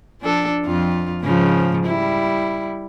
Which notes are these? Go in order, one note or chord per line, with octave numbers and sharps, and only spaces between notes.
F3 D4 A4
F2 F4
G#2 C#3 F3
G3 E4